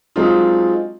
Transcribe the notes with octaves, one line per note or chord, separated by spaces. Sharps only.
F#3 G#3 C4 D4 D#4 F4